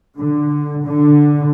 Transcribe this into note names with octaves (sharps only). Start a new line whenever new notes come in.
D3
D3